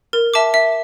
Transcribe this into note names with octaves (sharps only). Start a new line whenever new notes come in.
A#4
E5 A5 D6
E5